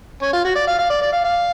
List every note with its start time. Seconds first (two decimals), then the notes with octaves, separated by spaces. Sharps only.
0.22 C#4
0.33 F4
0.45 F#4
0.55 D5
0.67 F5
0.79 F5
0.90 D5
1.01 D5
1.12 F5
1.24 F5